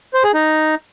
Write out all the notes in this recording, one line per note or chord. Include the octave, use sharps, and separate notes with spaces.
C5
G#4
D#4